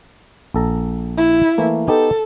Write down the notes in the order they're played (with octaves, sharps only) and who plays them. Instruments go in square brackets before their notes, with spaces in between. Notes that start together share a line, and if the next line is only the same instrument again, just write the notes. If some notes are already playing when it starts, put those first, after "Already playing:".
[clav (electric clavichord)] A#1 A4 A#5
[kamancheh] E4
[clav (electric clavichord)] E3 A3 A#3
[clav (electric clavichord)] B3 D#4 G4 [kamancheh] A4